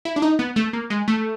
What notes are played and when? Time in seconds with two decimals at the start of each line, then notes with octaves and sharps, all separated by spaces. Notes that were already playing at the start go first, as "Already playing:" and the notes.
0.05 E4
0.16 D4
0.22 D#4
0.39 B3
0.56 A3
0.73 A#3
0.90 G#3
1.08 A3